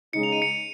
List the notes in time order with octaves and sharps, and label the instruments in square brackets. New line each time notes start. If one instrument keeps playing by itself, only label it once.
[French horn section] C#3 G#3 D#4 [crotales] C#7
[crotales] F7
D#7
C#7